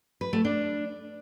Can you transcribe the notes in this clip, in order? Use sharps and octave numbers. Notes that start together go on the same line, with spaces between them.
B4
A3
D4